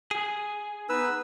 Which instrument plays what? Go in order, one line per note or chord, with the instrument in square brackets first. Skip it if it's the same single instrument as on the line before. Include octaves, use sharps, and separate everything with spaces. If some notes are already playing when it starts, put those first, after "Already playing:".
[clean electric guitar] G#4
[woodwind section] B3 D#4 [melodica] B4 E6